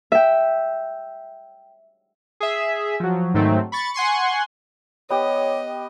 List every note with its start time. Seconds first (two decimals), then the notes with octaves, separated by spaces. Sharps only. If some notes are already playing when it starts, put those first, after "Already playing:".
0.12 E5 G5
2.40 G#4 E5
3.00 F3 F#3
3.34 G#2 D#3 F#3 A3 C4
3.72 B5 C#6 A6
3.94 F#5 G#5 C6 C#6
5.10 B3 G4 C#5 D#5